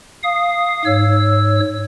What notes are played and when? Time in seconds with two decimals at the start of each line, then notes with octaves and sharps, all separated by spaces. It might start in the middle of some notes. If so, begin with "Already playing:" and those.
0.24 F5 D#6
0.85 G#2 C#5 E6